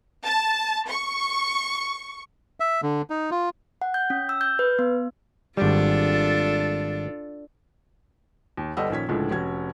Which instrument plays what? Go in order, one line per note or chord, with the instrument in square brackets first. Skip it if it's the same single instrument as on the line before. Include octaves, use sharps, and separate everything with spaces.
[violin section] A5
C#6
[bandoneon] E5
D3
D#4
F4
[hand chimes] F#5
G6
C#4
E6
G6
B4
B3
[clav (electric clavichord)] G#1 G3 [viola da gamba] D4 F4 A4
[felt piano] D#2
G1 G3 A4 D#5 F#5 E6
A#1 D#3 C#4 G#6 B6
C#2 A2 D3 F3 G#3 A3
F1 C#4 F#4 G#6